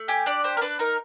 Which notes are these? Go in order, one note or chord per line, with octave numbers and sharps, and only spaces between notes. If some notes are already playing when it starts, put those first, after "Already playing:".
Already playing: A3
G4 G#5
D4 D5
G4 C5
A#4
D4 B4
D#4 A#4